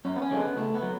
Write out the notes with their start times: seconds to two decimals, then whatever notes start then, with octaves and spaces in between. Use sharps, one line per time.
0.05 F#2 C#4
0.16 B3
0.22 C#4
0.31 D3 G#3
0.39 B3
0.57 C#2 A3
0.74 B3
0.83 F#3